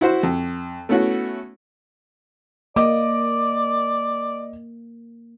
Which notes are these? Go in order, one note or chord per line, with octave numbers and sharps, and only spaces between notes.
E4 F#4 C5
F2
A3 B3 C#4 E4 F#4
A#3 D5 D#5 D6